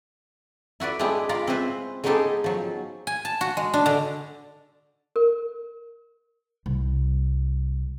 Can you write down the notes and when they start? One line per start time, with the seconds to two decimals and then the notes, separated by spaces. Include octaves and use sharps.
0.80 E4 F#4 B4 D5
0.99 G#3 B3 D4 E4 G4
1.29 F4 D5 A#5 B5
1.47 C4 C#4 E4 B4 C5
2.04 G#3 B3 C#4 D#4 G4 A4
2.44 F3 F#3
3.07 G#5
3.25 A5
3.41 F#4
3.57 G#3
3.74 D4
3.86 D3
5.16 A#4
6.66 C2